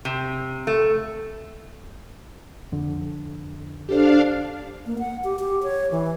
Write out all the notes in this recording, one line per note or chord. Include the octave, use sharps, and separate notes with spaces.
C3
A3
F2 D3
D4 G4 A4 C5 F5
A#3
F#5
G4
G4
C#5
E3